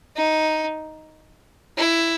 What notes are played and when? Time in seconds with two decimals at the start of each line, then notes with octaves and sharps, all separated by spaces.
0.16 D#4
1.78 E4